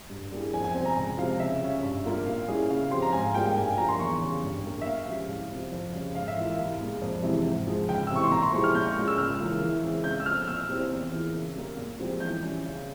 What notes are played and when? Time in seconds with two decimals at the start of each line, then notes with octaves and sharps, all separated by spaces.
0.10 G2
0.32 G3 A#3 E4 G#4
0.53 F2 G#5
0.64 G#5
0.75 C3 G3 C4 G#5
0.85 A#5
0.97 C#2
1.18 C3 F3 F5
1.40 C#3 E5
1.62 G3 C#4
1.83 G2
2.05 G3 A#3 F4
2.26 A#2 F5
2.48 G3 C#4 E4 G#4
2.70 C#3 F5
2.91 F3 C4 G4 C6
3.02 A#5
3.13 G#2 G#5
3.24 F5
3.35 G3 A#3 F4 G#4 G5
3.45 G5
3.56 G2 G#5
3.67 G#5
3.77 F3 A#3 A#5
3.88 C6
3.99 E2 C#6
4.22 C#3 G3
4.43 G2
4.64 G3 A#3
4.82 E5
4.86 A#2 F5
5.08 F3 G#3 C#4 G4
5.28 C2
5.51 C3 F3
5.72 F2
5.94 C#3 G3
6.15 G#2 F5
6.28 E5
6.37 E3 A#3 F4 F5
6.59 C2
6.81 A#2 G#3
7.02 F2
7.23 C3 E3 G#3 E4
7.45 G#2
7.67 F3 G#3
7.88 C#2 G5
8.07 E6
8.11 C3 E3 C#6
8.23 C6
8.32 A#2 A#5
8.42 C6
8.53 F3 G#3 E4 G4 C#6
8.64 F6
8.75 A#2 G6
8.85 C#6
8.96 G#3 C#4 F4
9.08 E6
9.18 C#2 F6
9.40 C#3 E3 A#3 F4
9.61 E3
9.83 G#3 C4
10.04 C#3 G6
10.20 E6
10.26 F3 C4 F6
10.48 A#2 E6
10.69 G3 C4 E4 G4
10.91 E2
11.12 E3 A#3 F4 G#4
11.34 C#3
11.55 G3 A#3
11.77 A#2
12.00 F3 G#3 C4 G4
12.20 E3 G6
12.43 G3 C#4
12.64 C#3